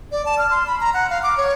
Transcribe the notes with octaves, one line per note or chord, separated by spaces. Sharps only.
D5
A5
F6
C6
B5
A#5
F#5
F5
D6
C#5